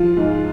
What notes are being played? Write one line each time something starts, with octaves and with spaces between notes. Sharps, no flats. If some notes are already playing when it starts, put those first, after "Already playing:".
Already playing: F3 F4
G#2